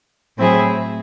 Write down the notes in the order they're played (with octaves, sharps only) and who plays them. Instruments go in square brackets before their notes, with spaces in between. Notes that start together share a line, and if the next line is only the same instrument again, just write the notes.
[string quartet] A2 F#3 C4 E4 G#4